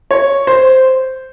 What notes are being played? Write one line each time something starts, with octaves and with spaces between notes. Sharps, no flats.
C#5
C5